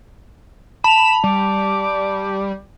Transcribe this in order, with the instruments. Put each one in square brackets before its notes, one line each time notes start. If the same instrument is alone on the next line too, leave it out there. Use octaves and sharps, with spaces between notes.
[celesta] A5 F7 [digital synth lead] B5 [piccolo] E7
[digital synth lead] G3 [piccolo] D6